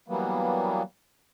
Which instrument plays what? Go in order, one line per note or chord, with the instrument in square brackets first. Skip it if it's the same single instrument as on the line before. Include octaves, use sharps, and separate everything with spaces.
[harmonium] E3 F#3 G3 A#3 B3